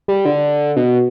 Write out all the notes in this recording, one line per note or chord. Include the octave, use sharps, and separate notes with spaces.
G3
D3
B2